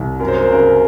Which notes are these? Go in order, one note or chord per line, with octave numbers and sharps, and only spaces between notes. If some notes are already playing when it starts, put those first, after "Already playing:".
Already playing: C2
F#2 A#4
C5
A#4
C5
C#3 A#4